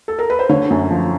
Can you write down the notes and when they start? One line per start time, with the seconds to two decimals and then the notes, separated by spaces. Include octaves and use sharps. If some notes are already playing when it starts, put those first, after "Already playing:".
0.08 A4
0.19 A#4
0.30 B4
0.39 C5
0.49 D3 C#5
0.70 F#2
0.91 F3